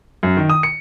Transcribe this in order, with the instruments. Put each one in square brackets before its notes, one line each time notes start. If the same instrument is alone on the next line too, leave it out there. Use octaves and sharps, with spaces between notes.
[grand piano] F#2
D#3
D#6
C#7